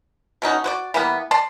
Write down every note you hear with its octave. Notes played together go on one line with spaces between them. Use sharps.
B2 C#4 D#4 F#4
F#4 C5 D5
E3 G3 A#3 B3
D5 A5 C6